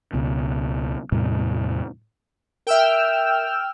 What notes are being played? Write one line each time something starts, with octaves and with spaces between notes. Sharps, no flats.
C#2 B2
E2 A2 C3 G3
A#4 E5 G5 E6 F6